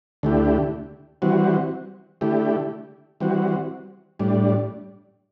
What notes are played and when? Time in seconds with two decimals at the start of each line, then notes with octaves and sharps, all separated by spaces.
0.23 D2 D3 A3 E4 G4
1.22 E3 G3 C4 F#4
2.21 D3 A3 E4 G4
3.20 E3 G3 C4 F#4
4.19 A2 G3 D4